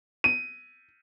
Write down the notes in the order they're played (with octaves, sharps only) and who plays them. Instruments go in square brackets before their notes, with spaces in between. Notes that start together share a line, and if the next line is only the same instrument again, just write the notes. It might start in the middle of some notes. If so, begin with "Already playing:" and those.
[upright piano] D#7